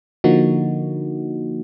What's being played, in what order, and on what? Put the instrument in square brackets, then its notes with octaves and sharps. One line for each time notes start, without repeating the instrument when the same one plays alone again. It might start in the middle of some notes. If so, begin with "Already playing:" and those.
[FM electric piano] D3 F3 A#3 D#4 F#4